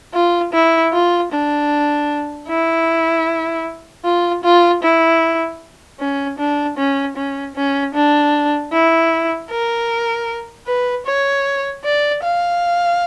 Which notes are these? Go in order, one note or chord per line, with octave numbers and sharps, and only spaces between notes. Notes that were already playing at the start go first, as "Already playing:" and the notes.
F4
E4
F4
D4
E4
F4
F4
E4
C#4
D4
C#4
C#4
C#4
D4
E4
A#4
B4
C#5
D5
F5